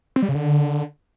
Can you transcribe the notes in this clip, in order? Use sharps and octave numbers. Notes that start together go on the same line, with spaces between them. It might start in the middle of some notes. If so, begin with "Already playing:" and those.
C4
G3
C#3
D3